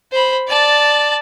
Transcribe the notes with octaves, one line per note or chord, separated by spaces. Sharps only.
C5 B5
D5 A5